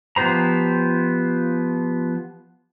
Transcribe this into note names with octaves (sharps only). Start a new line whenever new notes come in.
F3 B3 G4 C5 A#5